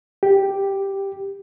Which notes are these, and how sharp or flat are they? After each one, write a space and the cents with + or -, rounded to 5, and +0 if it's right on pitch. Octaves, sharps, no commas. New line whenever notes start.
G4 +0